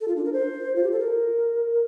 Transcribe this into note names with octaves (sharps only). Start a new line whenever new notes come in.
A4
F4
D4
A#4
C5
F4
G4
A4
A#4